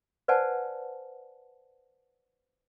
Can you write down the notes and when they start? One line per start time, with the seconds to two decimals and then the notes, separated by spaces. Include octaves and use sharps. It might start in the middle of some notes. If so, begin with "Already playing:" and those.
0.28 B4 C5 D5 F#5 G#5 A5